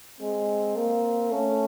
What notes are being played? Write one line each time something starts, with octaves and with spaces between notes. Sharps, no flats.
G#3 C4
A#3
A3 C#4